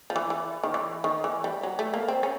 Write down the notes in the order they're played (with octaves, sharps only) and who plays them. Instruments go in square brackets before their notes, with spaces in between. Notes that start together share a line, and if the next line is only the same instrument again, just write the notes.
[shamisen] F3
E3
E3
D#3
E3
D#3
E3
G3
F#3
A3
A#3
C4
C#4